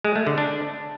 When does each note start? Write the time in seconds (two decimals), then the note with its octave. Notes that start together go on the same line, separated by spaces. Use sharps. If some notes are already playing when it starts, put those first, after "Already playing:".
0.05 G#3
0.16 A3
0.27 D3
0.38 D4